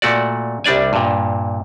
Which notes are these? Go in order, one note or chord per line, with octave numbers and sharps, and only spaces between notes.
A#2 A3 F#4 D5
C2 G3 D4 D5 G#5
G2 A#2